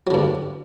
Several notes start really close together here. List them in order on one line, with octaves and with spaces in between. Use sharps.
F#3 D3 G2